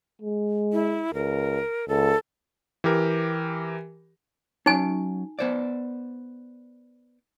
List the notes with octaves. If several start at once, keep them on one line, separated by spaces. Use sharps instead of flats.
G#3
E4
C#2 A#4
C#2 A4
E3 G4 A#4
F#3 C#4 D#4 G#5
B3 C5 D5